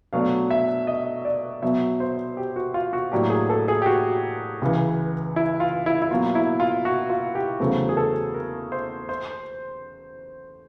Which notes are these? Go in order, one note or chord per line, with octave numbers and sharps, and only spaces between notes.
B2 F#3 A3 D4 F5
E5
D#5
D5
B2 F#3 B3 E5
C5
G4
F#4
F4
F#4
A2 F#3 A#3 D4 G4
G#4
A4
G#4
G4
F#4
C#2 C#3 E3
E4
F4
E4
E4
B2 F#3 A#3 F4
E4
F4
F#4
F4
G4
E2 C#3 F#3 A3 C4
G#4
A4
A#4
C5
C5